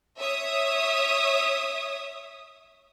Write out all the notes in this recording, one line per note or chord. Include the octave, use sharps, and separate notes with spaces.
C#5 E5 D#6